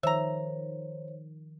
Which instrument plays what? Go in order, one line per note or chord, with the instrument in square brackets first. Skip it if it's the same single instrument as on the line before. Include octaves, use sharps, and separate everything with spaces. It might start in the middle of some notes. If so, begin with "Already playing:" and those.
[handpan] D#3 F3 [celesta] C5 C#5 [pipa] E5 A#5